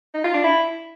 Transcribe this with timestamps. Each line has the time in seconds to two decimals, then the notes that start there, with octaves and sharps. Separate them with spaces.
0.14 D#4
0.24 F4
0.34 D4
0.44 E4